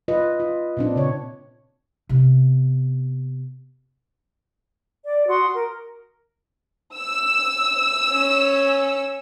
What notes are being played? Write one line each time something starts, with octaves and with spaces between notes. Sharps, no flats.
F4 B4 D#5
F4
A#2 C4 D4
C#3 C#5
C3 B3
D5
F#4 C6 D#6
A#4
E6
C#4 C#5